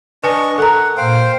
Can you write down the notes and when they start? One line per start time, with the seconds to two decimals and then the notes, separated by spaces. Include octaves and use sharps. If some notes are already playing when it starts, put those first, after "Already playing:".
0.24 D4 B4 D#5 G#5 C#6
0.58 A4 A#4 F#5 A#5
0.97 A#2 C5 F5 G5